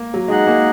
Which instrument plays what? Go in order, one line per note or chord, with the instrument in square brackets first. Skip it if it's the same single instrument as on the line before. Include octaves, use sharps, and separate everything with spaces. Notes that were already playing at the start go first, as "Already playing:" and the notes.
Already playing: [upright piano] A#3
F#3
[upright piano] G#3 [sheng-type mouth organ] D#4 G#4 D#5 F#5
[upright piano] A#3